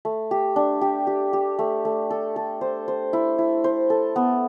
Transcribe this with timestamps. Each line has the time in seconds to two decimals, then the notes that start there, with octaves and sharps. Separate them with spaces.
0.05 A3
0.31 G4
0.56 D4
0.81 G4
1.07 G4
1.33 G4
1.59 A3
1.85 A3
2.10 A4
2.36 A4
2.61 C5
2.88 C5
3.13 E4
3.38 E4
3.64 C5
3.90 A4
4.16 B3